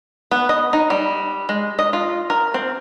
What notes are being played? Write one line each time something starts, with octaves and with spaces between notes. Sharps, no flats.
B3
D#5
D#4
G3
G#3
D#5
F4
A#4
C4